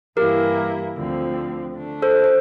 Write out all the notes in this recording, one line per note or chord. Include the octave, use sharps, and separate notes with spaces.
G2 E3 A#3 E4 G4 A#4
D2 D3 F3 C4
D3 A3 D4
A4 C5
C5